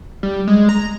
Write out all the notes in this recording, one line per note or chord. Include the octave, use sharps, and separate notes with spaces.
G3
G#3
A#5